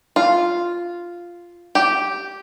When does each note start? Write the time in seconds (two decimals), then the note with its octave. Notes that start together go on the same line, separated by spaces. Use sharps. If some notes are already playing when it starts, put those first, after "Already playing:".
0.16 F4
1.75 G4